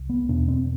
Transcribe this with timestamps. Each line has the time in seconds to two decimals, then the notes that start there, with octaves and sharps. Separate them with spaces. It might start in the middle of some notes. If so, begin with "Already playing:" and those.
Already playing: C2
0.10 B3
0.29 E2 B2 D4
0.48 C4